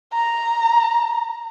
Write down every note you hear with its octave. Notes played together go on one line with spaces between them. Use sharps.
A#5